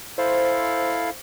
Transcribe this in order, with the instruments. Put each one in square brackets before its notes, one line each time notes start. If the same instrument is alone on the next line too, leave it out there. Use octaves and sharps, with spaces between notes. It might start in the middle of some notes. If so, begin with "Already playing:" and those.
[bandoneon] E4 A4 F5 [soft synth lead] C5